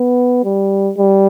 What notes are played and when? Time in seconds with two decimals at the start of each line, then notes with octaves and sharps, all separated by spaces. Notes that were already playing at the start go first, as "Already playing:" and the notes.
Already playing: B3
0.45 G3
0.98 G3